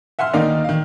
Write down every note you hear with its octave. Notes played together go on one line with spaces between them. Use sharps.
E5 F#5 G#5 C6 F6
D2 D#3 A#3 D#4 D5 F5
D#3 F5